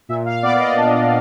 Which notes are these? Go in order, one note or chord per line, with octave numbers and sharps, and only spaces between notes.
A#2 E5
F5
B3 D5
D5
D#5
D4